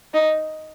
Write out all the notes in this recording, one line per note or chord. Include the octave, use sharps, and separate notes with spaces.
D#4